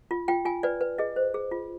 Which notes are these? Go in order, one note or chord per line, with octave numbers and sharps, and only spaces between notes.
F4
F4 G5
F4 G#5
B4 D5
B4
G#4 D#5
C5
G#4
F4